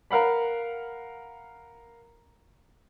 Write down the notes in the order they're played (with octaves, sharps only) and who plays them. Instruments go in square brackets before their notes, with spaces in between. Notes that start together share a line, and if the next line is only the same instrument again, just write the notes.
[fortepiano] A#4 F5 F#5 B5